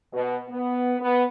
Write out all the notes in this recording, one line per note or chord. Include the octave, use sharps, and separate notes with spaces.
B2
B3
B3